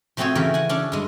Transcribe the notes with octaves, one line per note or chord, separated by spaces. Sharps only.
F3 A3 C4 F#4 G#4 C#5
C#3 E3 F#4 G4 A#4
F#5 G#5
C#4 D4 A4 D5
G2 G#3